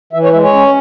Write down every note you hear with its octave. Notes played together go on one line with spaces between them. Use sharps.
E3 E5
C#5
G#3 E5
C#5
C#4